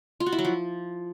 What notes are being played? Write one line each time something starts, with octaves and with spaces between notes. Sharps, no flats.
F4
F#4
E4
F#3
F3